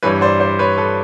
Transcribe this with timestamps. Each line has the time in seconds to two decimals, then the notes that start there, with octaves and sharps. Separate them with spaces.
0.03 G2 E3 G3 B4 C#5
0.21 C5 D5
0.40 C5 D5
0.59 B4 C#5
0.78 A4 B4